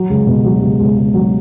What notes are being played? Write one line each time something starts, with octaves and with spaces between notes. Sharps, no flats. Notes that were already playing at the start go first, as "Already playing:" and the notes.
Already playing: F#3
C#2
B2
F#3
C#2
C#2
C#2
F#3